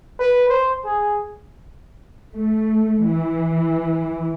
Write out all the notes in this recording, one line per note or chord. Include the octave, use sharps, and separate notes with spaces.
B4
C5
G#4
A3
E3